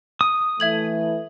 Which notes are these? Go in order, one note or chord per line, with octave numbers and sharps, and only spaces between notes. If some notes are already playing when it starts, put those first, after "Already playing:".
D#6
E3 A3 E5 G#6 F#7